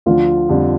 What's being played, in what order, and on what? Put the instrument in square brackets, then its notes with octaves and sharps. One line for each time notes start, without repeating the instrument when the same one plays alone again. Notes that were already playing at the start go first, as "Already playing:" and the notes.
[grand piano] D2 D3 F3 [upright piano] F4
[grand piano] F2 D3 G3